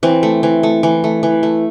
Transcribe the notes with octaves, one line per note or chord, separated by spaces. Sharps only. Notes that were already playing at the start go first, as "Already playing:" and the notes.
E3 C4
A3
E3
A3
E3
A3
E3
A3